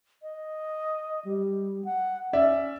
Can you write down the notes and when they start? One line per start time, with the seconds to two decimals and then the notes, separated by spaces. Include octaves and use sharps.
0.23 D#5
1.25 G3
1.85 F#5
2.33 C#4 D5 E5